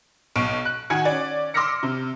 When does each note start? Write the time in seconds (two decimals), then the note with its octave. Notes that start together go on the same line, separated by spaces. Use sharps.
0.36 B1 C#6 D7
0.65 F#6
0.90 D#3 F#4 F#5 G#5 G#6 C#7
1.05 C#4 D5
1.54 C6 D6 E6 F6 A#6 C#7
1.83 C3